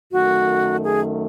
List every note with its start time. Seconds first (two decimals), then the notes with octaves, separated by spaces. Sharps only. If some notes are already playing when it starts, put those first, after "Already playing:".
0.12 F#2 D#3 A3 F#4
0.84 G#4